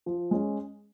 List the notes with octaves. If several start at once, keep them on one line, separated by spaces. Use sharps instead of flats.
F3
G#3 C#4